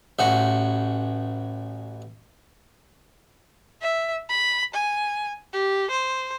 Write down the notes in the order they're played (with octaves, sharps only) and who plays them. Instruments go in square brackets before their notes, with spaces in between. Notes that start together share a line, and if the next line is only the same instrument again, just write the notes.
[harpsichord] A1 F#4
[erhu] E5
B5
G#5
G4
C5